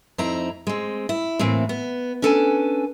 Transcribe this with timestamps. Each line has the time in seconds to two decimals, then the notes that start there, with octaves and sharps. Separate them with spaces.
0.18 F2 C4 D#4 E4 A#5
0.67 G#3 C4
1.09 E4
1.39 A2 E3 A#3 C4
1.69 B3
2.22 C#4 D4 A4 B4 G#5